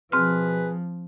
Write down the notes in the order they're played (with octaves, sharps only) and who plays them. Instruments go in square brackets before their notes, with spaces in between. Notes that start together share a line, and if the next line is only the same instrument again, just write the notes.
[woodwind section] B2 G#4 B4 [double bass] F3 [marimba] C4 F6